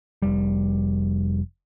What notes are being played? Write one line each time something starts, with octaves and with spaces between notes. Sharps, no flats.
F1 G3